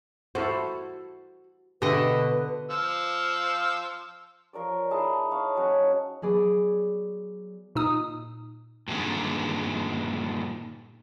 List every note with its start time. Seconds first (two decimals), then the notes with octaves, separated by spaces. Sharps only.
0.35 E4 F#4 A4 C5
1.82 B2 D3 G4 B4 D#5 E5
2.70 F3 F5 E6
4.53 F3 A#4 C#5 D5
4.90 D#4 E4 G#4 A5
5.31 C#5 F5
5.57 F#3 C#4 F#5
6.22 F#3 B3 G#4 D5
7.75 A#2 D#4 D#6
8.88 G2 A#2 D3 D#3 G#3